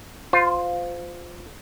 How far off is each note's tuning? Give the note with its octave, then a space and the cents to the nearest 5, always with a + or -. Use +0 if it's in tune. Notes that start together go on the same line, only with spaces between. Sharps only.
F4 +10 C5 -20